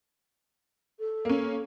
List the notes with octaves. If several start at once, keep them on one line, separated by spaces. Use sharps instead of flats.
A4
A#3 C#4